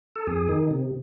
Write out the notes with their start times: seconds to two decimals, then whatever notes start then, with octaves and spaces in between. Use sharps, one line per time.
0.16 A4
0.27 F2 G#4
0.49 D#3
0.71 C3